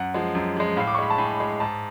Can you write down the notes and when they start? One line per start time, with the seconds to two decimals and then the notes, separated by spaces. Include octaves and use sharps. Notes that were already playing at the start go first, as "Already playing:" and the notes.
Already playing: F#2 F#5
0.14 F3 G#3
0.35 F#2
0.57 F3 G#3
0.77 A2 F5
0.87 D6
0.95 C#6
0.98 G#3 B5
1.10 A5
1.18 A2 G#5
1.40 G#3
1.60 G#2 A5